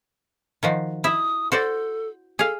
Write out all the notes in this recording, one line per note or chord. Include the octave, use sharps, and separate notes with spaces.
D#3 F3 F#4
E4 E5 D#6
F#4 A4 C5 D5
G#4 A4 F5